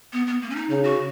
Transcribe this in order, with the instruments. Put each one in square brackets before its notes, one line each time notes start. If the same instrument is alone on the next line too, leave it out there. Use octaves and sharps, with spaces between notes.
[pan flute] B3
B3
A#3
C#4
D#4
[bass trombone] C#3 [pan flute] D#4
[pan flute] F#4